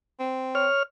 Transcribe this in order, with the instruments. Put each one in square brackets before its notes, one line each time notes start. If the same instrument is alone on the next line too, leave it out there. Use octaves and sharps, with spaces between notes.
[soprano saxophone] C4
[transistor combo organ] C#5 F6